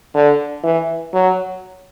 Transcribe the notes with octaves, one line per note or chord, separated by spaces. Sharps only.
D3
E3
F#3